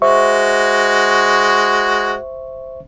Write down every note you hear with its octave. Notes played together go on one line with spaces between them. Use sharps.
G#3 F#4 C5 E5 C#6